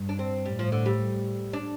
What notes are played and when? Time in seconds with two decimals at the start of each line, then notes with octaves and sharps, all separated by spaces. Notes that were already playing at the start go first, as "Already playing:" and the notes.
Already playing: G2
0.09 D4
0.19 C4
0.45 A2 G3
0.59 F3
0.72 D3
0.86 G3
1.53 D4